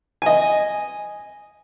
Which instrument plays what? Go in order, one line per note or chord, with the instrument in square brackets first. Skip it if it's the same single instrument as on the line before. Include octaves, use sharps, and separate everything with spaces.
[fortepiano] D#5 G#5